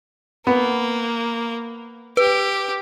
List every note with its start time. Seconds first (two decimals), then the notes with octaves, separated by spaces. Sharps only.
0.47 A#3 B3
2.17 G4 B4